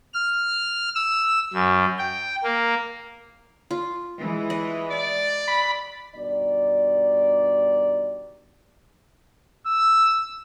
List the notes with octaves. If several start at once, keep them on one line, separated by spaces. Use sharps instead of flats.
F6
E6
F#2
G5
A#3
F4
E3 G#3
D#5
D5
B5
G2 B2 D#3 D5
E6